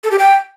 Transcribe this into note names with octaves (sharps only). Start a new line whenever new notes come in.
A4
G4
G5